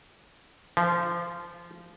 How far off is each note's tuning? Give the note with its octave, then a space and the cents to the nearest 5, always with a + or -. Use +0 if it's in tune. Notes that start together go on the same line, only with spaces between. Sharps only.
F3 -20